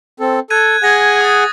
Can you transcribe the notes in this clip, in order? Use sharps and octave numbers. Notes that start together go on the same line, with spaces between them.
C4 A4
A4 F#6 G#6 D#7
G#4 F#5 G#5 G#6 A#6
D#6 A6